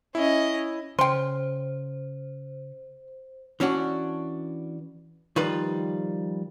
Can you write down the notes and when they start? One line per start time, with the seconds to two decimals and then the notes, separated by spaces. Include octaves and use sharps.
0.15 C#4 E4 D#5
0.99 C#3 C5 G5 C6
3.60 E3 C#4 D4 F#4
5.36 D#3 F3 G3 F4 B4